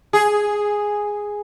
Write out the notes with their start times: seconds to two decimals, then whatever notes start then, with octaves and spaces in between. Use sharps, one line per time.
0.13 G#4